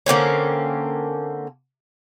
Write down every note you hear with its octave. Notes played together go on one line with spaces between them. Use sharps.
D3 A#3 C4 C#4